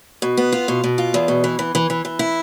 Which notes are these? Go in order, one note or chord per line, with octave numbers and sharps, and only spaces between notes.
B2
B3
F4
B2
B2
F4
E2
B2
E3
E3
E3
E3
E3
E4